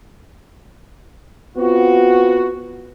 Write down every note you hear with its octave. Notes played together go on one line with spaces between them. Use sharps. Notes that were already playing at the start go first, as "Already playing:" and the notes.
B3 C4 F4 F#4